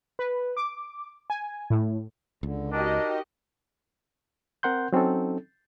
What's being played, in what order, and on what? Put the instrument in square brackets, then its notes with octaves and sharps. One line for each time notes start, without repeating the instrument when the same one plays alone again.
[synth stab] B4
D6
G#5
A2
[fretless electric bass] C#2 [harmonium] D3
[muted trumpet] D4 [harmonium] D#4 A#4 [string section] F#4 G4 D#5
[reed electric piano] C4 A#4 F#5 C6 G6
F#3 C4 C#4 D#4 A4